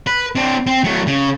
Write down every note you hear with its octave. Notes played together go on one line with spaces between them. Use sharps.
B4
C4 D4
C4
F#3 A3
C#3